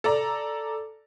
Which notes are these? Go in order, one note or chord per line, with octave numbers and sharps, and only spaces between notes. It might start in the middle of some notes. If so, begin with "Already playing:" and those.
A4 D5 A#5